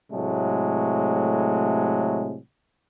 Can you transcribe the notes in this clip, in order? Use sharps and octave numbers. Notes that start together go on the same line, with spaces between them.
A2 C3 F#3 G#3 A3